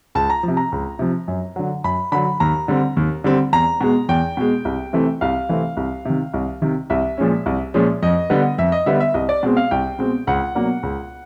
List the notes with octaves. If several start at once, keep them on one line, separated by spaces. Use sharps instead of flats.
C#2 A5
A#5
C3 F3
A#5
C#2
C3 F3
F#2
D3 F#3
F#2 B5
D3 F#3 B5
D#2 A#5
D3 G3 C4
D#2
D3 G3 C4
E2 A#5
B2 G#3
E2 G5
B2 G#3
C2
C3 E3 A3 C4
C2 F5
C3 E3 A3 C4
C2
C3 D#3
C2
C3 D#3
C2 E5
A#2 F3 G#3 C#4
C2
A#2 F3 G#3 C#4
F2 D#5
D3 G3 B3
F2 E5
D#5
D3 G3 B3 E5
E5
C2 D#5
D5
B2 G#3 C4
F5
C2 G5
B2 G#3 C4
C#2 F#5
B2 F#3 A#3 D4
C#2